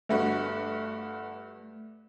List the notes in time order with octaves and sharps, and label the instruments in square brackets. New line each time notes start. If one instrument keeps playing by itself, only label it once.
[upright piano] G1 G2 F#4 [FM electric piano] A3 [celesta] E5